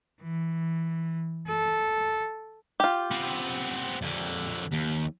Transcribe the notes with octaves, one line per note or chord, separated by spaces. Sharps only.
E3
A4
F4 G4
B3 C4
F2 D3
D#2